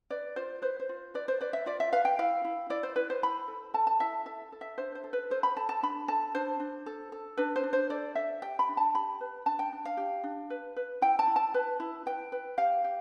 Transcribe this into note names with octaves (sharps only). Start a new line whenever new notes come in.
B4 D5
F4 C5
B4 C5
C5
F4
B4 D5
C5
B4 D5
E5
F4 D5
E5
B4 F5
G5
E4 F5
E4
E4 D5
C5
E4 B4
C5
E4 B5
A4
A4 A5
A5
E4 E5
A4 E5
A4
E5
D4 C5
C5
A4
B4
A4 C5
B5
A4 A5
A5
D4 B5
A4 A5
D4 C5
D4
A4
A4
D4 B4
C5
D4
C5
A4 D5
A4 E5
G4 G5
B5
D4
A5
G4 B5
B4
D4 A5
G5
D4
F5
G4
D4
B4
B4
E4 G5
A5
E4
A5
B4
E4
B4 G5
B4
G4 F5
G4